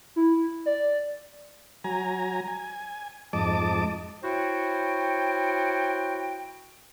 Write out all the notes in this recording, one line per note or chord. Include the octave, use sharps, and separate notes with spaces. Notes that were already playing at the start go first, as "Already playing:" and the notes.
E4
D5
F#3 G#5 A#5
G#5
F2 G#2 D#5 A5 D6
E4 F#4 C5 C#5 G5